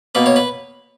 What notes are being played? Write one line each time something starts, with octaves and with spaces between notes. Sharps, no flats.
B2 A#3 B4
C#5
B4